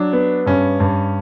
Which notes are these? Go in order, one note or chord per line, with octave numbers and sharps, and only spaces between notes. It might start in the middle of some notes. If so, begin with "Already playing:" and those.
Already playing: F#3 D4
B3
G2 C#4
G2